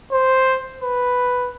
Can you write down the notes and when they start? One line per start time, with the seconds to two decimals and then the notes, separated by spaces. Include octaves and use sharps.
0.12 C5
0.82 B4